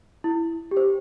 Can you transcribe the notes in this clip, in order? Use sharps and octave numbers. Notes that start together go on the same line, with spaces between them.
E4
G4
C5